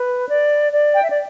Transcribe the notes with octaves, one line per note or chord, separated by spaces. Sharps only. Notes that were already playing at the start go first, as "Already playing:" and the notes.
Already playing: B4
D5
D5
G5
E5
D5